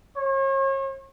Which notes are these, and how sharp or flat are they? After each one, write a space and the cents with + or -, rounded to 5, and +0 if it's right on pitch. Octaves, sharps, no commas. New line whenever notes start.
C#5 -40